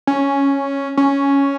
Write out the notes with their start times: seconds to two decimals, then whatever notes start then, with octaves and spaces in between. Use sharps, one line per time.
0.07 C#4
0.97 C#4